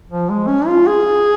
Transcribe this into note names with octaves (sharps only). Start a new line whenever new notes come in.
F3
G#3
C#4
F4
G#4